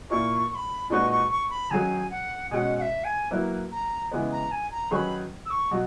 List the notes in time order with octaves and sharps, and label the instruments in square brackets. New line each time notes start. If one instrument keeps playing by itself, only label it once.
[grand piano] A#2 A#3 E4 A#4 [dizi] C#6
[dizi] C#6
B5
[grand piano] A#2 G#3 D#4 F#4 B4 [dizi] C#6
[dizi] C#6
C#6
B5
[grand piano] D#3 F#3 C#4 G#4 [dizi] G#5
[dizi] F#5
[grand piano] B2 G#3 C#4 [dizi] F#5 G#5
[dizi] F#5
E5
G#5
[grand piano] F#3 A#3 E4 B4
[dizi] A#5
[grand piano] C#3 E3 G#3 B3
[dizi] A#5
G#5
A#5
[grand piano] D#3 F#3 C#4 G#4 B4 [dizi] B5 C#6
[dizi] E6
C#6
[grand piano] B2 F#3 F#4